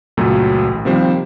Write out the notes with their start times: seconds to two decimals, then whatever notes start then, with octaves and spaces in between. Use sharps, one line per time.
0.17 C#2 F#2 A#2 F#3 A3
0.65 A1
0.85 C3 D#3 F3 G3 A#3 C5